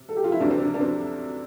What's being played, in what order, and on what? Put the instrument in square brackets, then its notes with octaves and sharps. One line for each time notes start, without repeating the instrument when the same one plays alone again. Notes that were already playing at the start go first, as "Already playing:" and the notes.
Already playing: [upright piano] C3
A4
G4
F4
E4
D2 C3 E3 D4
C4
D4
D4
C4